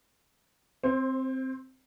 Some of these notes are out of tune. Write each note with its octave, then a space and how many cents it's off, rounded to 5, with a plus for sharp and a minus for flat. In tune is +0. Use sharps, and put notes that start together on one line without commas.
C4 +0 C5 +30